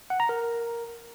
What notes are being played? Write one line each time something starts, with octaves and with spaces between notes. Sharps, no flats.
F#5
A#5
A#4